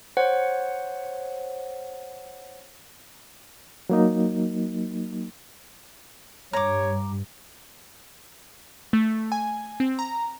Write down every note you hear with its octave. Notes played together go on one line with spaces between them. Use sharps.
C5 C#5 F#5
F#3 A#3 D#4
G2 C#5 A#5 D6
A3
G#5
C4
A#5